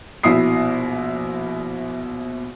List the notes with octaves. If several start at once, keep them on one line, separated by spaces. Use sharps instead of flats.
A#1 B2 E4 D#6 C7